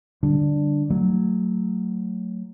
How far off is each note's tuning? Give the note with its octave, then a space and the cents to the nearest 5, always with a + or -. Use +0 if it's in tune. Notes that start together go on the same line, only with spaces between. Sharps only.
D3 +0 G3 +0 D4 +5
F#3 +0 A3 +20